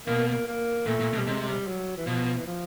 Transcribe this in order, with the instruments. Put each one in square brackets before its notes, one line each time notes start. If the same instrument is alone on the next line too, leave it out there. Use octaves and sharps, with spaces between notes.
[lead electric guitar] B2 [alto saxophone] A#3
[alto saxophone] A#3
A#3
[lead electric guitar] A#2 [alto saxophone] A3
[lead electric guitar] A#2
B2
[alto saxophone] G3
[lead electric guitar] C3 [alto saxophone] G#3
[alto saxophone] G#3
G3
F#3
E3
[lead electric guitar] B2 [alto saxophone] F3
[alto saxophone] E3
F3